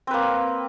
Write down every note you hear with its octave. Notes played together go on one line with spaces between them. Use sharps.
A#3 C4 B4